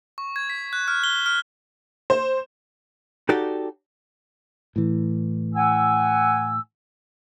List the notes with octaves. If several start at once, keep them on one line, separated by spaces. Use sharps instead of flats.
C#6
G#6
B6
F#6
F6
G7
F6
C5
D#4 F#4 G4 A4 D5
A2 E3
F#5 G#5 E6